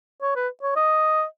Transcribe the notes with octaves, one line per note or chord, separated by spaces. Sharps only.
C#5
B4
C#5
D#5